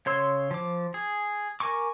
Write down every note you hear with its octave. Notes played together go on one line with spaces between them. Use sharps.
C#3 C#5 C6 E6
F3 D6
G#4
A#4 G#5 C#6 D6